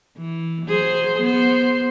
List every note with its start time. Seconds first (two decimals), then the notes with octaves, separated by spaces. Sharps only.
0.18 E3
0.66 F#3 G#4 C5
1.21 B3 C5